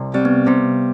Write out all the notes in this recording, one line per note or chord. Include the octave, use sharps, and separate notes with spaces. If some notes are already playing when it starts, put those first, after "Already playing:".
Already playing: C2 C3
G3 C4
B3
C3 B3